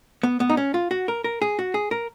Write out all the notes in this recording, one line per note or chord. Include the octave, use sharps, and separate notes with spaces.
B3
B3
D#4
C#4
F4
F#4
A#4
A#4
G#4
F#4
G#4
A#4